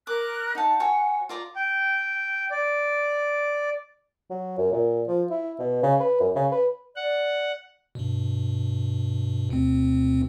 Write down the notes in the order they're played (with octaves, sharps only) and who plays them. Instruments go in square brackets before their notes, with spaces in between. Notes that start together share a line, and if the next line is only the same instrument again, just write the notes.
[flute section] A#4 F#6 [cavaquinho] D6
[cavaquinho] D#4 A5 [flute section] F#5
[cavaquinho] F#4 C#5 G#5
F4 D5 A#5
[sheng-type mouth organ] G5
D5
[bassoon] F#3
F#2
A#2
F3
E4
B2
C#3
B4
F#2
C#3
B4
[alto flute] D5 [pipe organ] F#5
[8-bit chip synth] G2 B2
D2 B2 C4